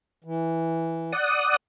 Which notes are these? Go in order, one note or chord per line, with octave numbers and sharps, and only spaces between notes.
E3
D5 F#5 D#6